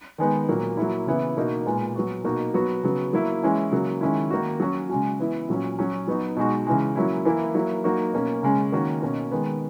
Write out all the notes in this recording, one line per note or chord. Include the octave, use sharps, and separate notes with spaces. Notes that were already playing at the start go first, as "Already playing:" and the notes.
D#3 G#3 B3 D#4
A#2 F#3 A#3
F#3 A#3 E4
C#3 E3 B3 E4
B2 A#3 D#4 F#4
A#2 G#3 B3
F#3 B3 F#4
B2 A#3 D#4 F#4
F#3 B3 F#4
C#3 F#3 B3
F#3 A#3 E4
E3 G#3 C#4 E4
C#3 F#3 A#3
D#3 G#3 C#4 E4
D#3 A#3 D#4 F#4
F#3 C#4 F#4
C#3 G#3 C#4 F#4
E3 B3 E4
A#2 F#3 C#4
F#3 C#4 F#4
F#3 B3 D#4 F#4
B2 G#3 D#4 F#4
C#3 E3 G#3
F#3 A#3 C#4 E4
E3 A#3 E4
F#3 A#3 E4
F#3 A#3 D#4 F#4
B2 A#3 C#4
C#3 G#3 C#4
D#3 A#3 C#4 F#4
B2 A#3 C#4
D#3 G#3 B3